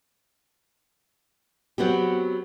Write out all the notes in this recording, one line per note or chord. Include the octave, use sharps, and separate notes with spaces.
F#3 B3 C4 G4